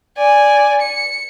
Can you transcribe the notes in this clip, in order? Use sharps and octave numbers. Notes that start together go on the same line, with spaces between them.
D5 G#5
C#7